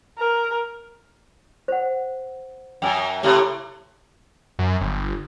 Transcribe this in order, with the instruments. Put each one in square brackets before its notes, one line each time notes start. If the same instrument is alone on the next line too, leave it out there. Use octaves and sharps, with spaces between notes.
[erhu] A#4
[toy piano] C5 F#5
[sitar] F#2 [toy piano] G5 G#5
[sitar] A2 C3 [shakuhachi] G4
[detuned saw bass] F#2
G1